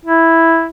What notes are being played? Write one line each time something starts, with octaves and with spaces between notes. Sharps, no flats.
E4